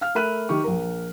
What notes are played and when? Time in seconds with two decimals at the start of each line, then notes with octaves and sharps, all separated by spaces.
0.01 F5 F6
0.15 A3 A#4 E5 B5 F#6 D#7
0.49 D#3 G4 C#6
0.64 A#1 A#4